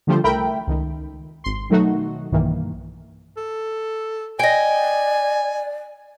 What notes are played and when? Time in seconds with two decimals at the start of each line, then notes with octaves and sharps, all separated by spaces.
0.07 D3 F3 G3 A3 C5
0.24 C2 A3 A#4 E5 G5 B5
0.67 C#2 D#3
1.44 G#1 C6
1.70 B2 D#3 F#3 A3 D#4 F#4
2.32 B1 G2 D#3 E3 A#3
3.37 A4
4.39 D5 D#5 G5 G#5